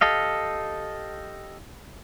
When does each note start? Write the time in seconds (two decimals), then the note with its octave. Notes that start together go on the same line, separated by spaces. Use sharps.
0.01 G4 A4 D#5 F5